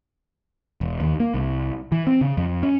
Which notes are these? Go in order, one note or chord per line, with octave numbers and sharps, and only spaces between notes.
E1
D#2
A#3
C2
E3
C4
C#3
F2
C#4